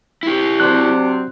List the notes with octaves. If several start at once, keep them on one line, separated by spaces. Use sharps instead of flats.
E4 G4
C3 F#3 C4 D4 F#6